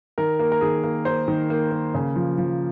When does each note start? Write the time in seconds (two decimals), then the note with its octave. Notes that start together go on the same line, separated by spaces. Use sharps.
0.18 D#3 A#4
0.39 A#3
0.52 A#4
0.61 D#3 G#4
0.84 A#3
1.05 A#3 C5
1.28 D#3
1.50 A#3
1.72 A#3
1.94 C#3
2.16 F3
2.38 F3